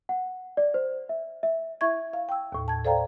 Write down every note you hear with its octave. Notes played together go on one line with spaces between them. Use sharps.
F#5
D5
C5
E5
E5
E4 E5 C#6 G#6
F5
G5 E6
D#2 A2
A5 G#6
A4 C5 D5 F5 G5 A#5